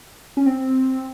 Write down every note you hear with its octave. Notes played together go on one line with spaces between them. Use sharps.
C#4
C4